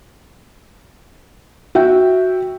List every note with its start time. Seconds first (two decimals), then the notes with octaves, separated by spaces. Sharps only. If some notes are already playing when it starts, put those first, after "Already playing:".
1.75 F#4 E5 G5